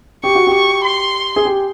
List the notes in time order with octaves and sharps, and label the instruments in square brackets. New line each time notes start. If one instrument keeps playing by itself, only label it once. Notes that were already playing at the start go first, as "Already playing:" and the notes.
[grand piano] G4 [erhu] C#6
[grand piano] F#4
G4
[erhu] C#6
C6
[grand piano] G#4
G4